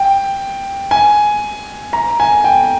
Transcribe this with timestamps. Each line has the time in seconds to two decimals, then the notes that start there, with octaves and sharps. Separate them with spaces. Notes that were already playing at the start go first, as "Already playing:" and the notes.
Already playing: G5
0.91 G#5
1.93 A#5
2.20 G#5
2.44 G5